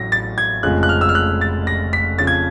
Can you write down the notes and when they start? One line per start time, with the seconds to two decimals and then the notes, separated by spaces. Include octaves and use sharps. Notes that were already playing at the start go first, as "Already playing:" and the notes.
Already playing: A1 A2 F#3 A#6
0.12 A6
0.38 G#6
0.63 F1 F2 C#3 F3 G#3 F#6
0.83 F#6
0.89 F6
1.01 E6
1.09 F6
1.15 F#6
1.41 A6
1.67 A#6
1.93 B6
2.19 F2 C#3 F3 A6
2.27 G#6